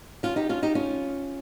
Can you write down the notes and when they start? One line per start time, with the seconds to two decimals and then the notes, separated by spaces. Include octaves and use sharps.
0.23 C#4 F4
0.36 D#4 G4
0.49 C#4 F4
0.63 D#4 G4
0.75 C#4 F4